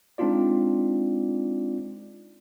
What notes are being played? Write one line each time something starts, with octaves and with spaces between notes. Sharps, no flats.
G#3 C4 D4 D#4 F4 D5